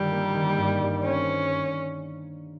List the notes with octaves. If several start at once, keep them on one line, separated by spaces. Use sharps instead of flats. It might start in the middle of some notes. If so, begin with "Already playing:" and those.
Already playing: G1 D#3 G3
A#3
D#3
G2
G2
C4 C#4